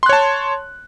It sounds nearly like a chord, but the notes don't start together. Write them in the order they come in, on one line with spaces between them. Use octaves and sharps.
C6 F#6 C#5 A5